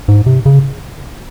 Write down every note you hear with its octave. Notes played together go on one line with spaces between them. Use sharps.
G#2
C3
C#3